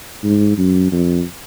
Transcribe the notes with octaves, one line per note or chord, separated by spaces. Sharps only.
G#2
F#2
F2